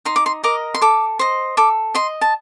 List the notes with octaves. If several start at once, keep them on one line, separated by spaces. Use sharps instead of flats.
D#4 C6
D6
C6
A#4 D#5 D6
C6
A4 D6
C5 D#5
A4 D6
D#5 C6
A5